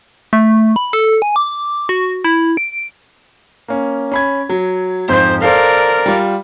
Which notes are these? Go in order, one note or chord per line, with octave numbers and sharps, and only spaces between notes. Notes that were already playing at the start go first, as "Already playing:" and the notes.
A3
B5
A4
G#5
D6
F#4
E4
D7
A#3 C#4
C#4 B5 G#6
F#3
F2 G#2 F3 C5
A4 A#4 C5 D5 F5
G3 F4